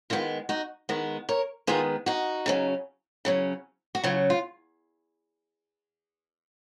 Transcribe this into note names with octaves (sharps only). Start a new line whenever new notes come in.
D#3 G#3 B3 F4
D#4 F#4
D#3 G#3 B3
A#4 C#5
D#3 G#3 B3 F4 G#4
D#4 F#4
C#3 F#3 C#4
C#3 F#3 C#4
F#4
C#3 F#3 C#4 F4
F4